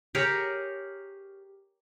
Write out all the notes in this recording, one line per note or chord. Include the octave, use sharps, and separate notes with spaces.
G4 G#4 A#4 C#5